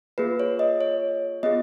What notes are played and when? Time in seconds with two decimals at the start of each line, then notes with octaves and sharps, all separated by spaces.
0.18 A#3 F4 G#4 B4
0.40 C#5
0.59 D#5
0.81 C#5
1.43 B3 F4 G#4 D#5